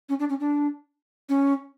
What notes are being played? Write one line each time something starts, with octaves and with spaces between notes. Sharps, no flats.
C#4
D4
C#4
D4
C#4